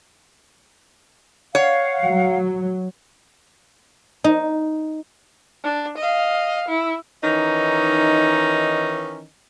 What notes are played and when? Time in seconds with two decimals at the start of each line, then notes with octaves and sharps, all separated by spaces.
1.55 C#5 F5 F#5
2.02 F#3
4.24 D#4
5.64 D4
5.98 D#5 F5
6.68 E4
7.23 D#3 E3 C#4 D#4 D#5